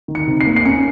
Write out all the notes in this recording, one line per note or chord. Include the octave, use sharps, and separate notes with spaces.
D#3
C#7
C3
C7
A#3
C7
C#4 C#7